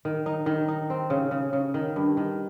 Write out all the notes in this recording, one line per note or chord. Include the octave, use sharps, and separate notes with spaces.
D#3
D#4
D#3
D#4
C4
C#3
C#3
C#3
D#3
G2
D#3